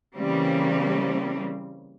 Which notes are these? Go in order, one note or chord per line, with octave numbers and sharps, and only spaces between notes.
C#3 E3 G3 A#3 C4